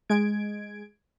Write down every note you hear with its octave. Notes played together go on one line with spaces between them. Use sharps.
G#3 G#6 D7